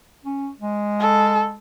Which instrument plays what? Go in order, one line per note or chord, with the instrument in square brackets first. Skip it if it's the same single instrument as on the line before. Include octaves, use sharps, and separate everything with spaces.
[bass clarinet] C#4
G#3
[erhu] A4